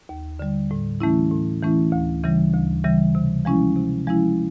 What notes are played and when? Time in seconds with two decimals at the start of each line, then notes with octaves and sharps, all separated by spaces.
0.09 D#2
0.39 D3 G3
0.71 A2
1.00 E3 A3 C#4 E4
1.31 A2
1.62 E3 A3 C#4 E4
1.92 D2
2.24 C#3 E3 G3
2.54 D2
2.84 C#3 E3 G3
3.15 C3
3.45 F3 G#3 C#4 E4
3.76 C3
4.07 F3 G#3 C#4 E4